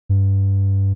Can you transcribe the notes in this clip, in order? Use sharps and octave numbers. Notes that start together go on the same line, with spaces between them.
G2